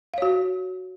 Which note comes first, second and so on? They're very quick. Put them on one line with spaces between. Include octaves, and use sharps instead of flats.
F5 C#5 F#4